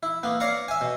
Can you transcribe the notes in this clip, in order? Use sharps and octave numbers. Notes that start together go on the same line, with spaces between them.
E4
A#3 B3
C#5 D5 F5 A#5 C#6
E5 G#5
B2